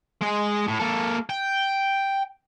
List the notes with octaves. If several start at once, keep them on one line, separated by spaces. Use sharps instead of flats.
G#3 D#5
A2
A#3 A4
G5